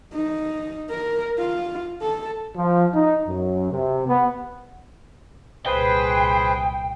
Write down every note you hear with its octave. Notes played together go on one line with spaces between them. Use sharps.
D#4
A#4
F4
A4
F3
D#4
F#2
C3
B3
C2 A#2 G#4 B4 C5 G5